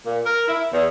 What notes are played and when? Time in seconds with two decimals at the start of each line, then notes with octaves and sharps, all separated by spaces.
0.05 A#2
0.25 A#4
0.48 E4
0.72 E2